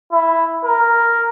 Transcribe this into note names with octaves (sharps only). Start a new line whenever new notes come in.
E4
A#4